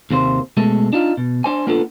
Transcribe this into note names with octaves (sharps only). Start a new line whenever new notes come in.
D#2 C3 A#3 C5
B2 G#3 A3 A4
D4 D#4 F4
B2
D4 C5 G#5
A#3 B3 D4 F4 A4